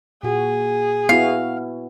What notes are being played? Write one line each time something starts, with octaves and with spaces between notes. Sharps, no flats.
A#2 F#4 G#4
B3 E4 F#4 F5